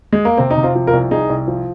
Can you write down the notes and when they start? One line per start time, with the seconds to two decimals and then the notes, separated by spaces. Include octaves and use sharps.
0.12 G#3
0.25 A#3
0.37 C3 C4
0.51 D#4
0.57 C3
0.63 C4 F4
0.75 F3
0.87 F4 A#4
0.93 C2
1.11 C2 D#4 G#4
1.29 C2
1.48 F3